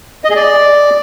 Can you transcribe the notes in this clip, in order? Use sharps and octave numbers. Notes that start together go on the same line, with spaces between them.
D#5
G#4
D5